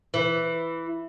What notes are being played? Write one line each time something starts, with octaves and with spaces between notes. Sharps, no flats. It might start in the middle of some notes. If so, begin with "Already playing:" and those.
E3